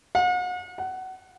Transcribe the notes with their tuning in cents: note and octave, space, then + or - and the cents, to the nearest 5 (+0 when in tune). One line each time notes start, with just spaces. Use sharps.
F#5 -40
F#5 +20